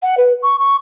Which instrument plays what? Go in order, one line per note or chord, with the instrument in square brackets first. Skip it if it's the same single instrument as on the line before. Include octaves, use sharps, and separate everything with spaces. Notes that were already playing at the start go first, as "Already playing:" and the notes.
[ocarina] F#5
B4
C#6
C#6